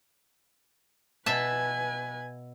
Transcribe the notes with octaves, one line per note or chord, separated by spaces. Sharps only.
B2 B4 E5 G#5 A5